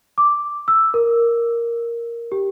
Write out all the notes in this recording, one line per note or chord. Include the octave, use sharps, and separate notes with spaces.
D6
E6
A#4
G4